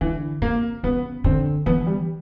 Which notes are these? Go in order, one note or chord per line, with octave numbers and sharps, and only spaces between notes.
D3 E3
C3 A#3
C#3 B3
D3 C4
E3 B3
G3